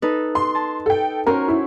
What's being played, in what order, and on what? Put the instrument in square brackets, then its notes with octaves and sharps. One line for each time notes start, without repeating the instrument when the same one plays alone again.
[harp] D#4 A4 B4
[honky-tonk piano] C6
[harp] A5
[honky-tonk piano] A4 G5
[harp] C#4 F#4 C5 [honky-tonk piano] A#4
[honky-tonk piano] E4